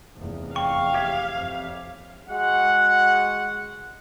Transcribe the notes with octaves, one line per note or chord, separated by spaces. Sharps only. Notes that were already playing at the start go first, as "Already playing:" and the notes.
F1 E2
F5 G5 C#6
G4 C#5 E5
F2
G#3 F#4 F#5